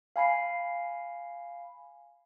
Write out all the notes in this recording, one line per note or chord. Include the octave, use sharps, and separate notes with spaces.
F5 G#5 B5 C7